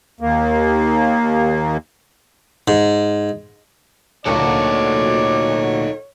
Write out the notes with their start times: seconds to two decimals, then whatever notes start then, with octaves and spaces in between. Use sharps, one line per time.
0.21 D#2 A#3
2.68 G#2
4.26 D2 A#2 D#4 F#4 A4 C#5 D5